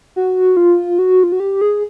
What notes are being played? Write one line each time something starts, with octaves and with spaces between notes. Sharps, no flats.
F#4
F4
F#4
F4
F#4
G4
G#4